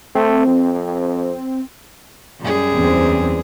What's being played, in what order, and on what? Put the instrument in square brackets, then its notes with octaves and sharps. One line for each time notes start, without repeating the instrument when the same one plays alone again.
[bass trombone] A3 [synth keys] C4
[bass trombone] F2
[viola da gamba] F#2 G3 G#4
[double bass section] E2 E3 C4